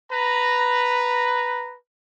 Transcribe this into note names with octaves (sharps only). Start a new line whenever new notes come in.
B4 A#5